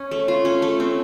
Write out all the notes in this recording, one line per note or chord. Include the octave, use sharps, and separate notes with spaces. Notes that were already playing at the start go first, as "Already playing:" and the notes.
Already playing: C#4
A3
F4
C#4
A3
C4